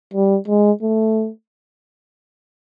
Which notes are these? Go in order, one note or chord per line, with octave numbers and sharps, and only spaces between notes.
G3
G#3
A3